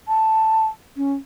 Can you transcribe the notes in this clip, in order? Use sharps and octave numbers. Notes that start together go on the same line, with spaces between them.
A5
C#4